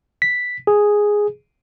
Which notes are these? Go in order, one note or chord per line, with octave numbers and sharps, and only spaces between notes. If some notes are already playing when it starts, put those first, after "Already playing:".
B6
G#4